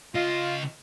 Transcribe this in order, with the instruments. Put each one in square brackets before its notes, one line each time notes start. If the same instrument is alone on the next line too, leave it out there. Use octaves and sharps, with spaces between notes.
[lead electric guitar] C#3 D#5 [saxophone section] F4